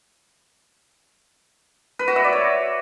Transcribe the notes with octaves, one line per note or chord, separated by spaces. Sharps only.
B4
F#4
E5
D5
C#5